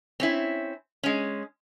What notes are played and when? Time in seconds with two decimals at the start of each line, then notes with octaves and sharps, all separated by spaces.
0.20 C4 C#4 E4
1.03 G#3 C#4